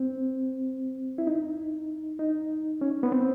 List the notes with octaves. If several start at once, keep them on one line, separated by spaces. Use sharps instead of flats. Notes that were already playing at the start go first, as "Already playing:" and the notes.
Already playing: C4
E4
D#4
D#4
C#4
B3
C4